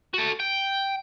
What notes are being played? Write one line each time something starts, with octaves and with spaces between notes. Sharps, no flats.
F#4 A4
G5